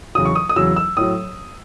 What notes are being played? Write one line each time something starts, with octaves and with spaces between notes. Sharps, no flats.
E2 C#3 F#3 D#6
C#6
D#6
D#6
E2 C#3 F#3 E6
E6
A2 F#3 D#6